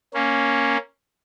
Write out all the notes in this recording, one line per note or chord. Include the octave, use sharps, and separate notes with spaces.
A#3 C#4